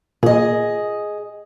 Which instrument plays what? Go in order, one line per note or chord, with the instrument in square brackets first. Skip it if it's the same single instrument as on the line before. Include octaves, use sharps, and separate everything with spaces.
[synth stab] A#2 [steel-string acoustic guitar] G#4 D#5